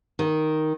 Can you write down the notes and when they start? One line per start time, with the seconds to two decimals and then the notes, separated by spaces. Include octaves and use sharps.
0.19 D#3